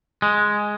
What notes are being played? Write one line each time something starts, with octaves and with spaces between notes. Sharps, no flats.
G#3